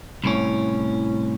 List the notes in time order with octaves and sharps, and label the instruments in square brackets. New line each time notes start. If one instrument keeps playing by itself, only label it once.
[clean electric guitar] C2 A2 C#4